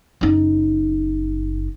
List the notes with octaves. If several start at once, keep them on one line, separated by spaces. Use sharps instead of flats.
F#1 D#4